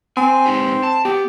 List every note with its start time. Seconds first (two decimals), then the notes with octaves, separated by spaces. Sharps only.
0.17 C4 G#5
0.46 G#3 D#4 G4
0.83 A5
1.05 B3 G4